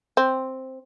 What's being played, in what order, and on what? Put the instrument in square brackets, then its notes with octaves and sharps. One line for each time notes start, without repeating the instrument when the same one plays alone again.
[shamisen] C4